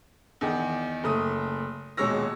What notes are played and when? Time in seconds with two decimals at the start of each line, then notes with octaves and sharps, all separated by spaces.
0.41 E2 D#3
1.04 F#1 A3 D#6
1.97 D#1 B2 G#3 C#5 E6 A#6